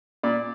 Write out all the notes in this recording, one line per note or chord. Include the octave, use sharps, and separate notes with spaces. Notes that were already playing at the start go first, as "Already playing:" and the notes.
A#2 D5